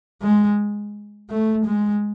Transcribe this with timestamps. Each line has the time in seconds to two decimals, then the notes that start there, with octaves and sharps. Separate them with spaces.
0.22 G#3
1.30 A3
1.66 G#3